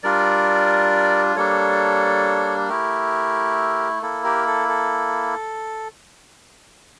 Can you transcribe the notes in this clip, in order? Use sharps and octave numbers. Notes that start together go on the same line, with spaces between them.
G3 D4 F4 A#4 D5
G3 A#3 D4 A4 C#5
A3 E4 G4 A#4
A#3 E4 A4
G4 A#4
A4
A4